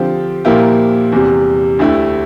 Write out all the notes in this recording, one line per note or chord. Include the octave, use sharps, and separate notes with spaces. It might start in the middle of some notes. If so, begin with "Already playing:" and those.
Already playing: D3 F3 C4 G4
A#2 F3 A#3 E4 G4
E2 C3 G3
D2 D3 A3 E4 G4